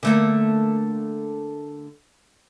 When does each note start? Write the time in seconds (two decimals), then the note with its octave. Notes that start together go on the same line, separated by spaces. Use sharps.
0.03 D3 A3 A#3